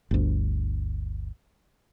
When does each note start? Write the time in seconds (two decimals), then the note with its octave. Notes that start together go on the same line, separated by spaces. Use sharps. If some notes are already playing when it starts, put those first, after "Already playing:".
0.11 G1 D2